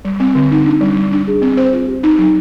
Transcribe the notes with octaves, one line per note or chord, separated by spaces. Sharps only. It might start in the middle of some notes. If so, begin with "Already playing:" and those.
G3
C4
D3
D#4
D4
G3
G3
D4
G#4
C4
C5
F4
G4
D#4
F#3